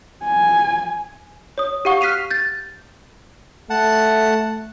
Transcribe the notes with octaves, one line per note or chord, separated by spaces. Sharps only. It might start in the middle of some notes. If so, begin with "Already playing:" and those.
G#5
C#5 D#6
G4 F5 F#5 C#6 D#6
F6 F#6 B6 C7 D#7 F7
G6 A6
A3 F#5 A5